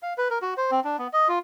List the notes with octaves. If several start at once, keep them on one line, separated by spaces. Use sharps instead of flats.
F5
B4
A#4
F#4
C5
C4
D4
B3
D#5
F4